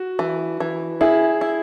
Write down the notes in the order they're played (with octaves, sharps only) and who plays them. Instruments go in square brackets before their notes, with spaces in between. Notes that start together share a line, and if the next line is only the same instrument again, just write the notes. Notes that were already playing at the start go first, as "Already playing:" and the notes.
Already playing: [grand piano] F#4
[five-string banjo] E3
E3
[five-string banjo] E4 [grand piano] G#4
[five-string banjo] E4